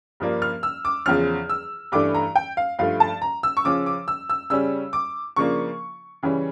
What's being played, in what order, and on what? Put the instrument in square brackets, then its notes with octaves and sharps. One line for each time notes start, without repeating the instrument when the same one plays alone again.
[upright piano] G2 F3 A#3 D4
F6
E6
D6
E2 C#3 F3 C#4 F6
E6
G2 E3 A3 D4 D6
A#5
G5
F5
G2 F3 A3 F5
A5
A#5
E6
C#6
C#3 F3 C#4 D6
D6
E6
E6
C#3 G3 C#4 E6
D6
C#3 F3 A#3 D4 C#6
C#3 E3 G3 C#4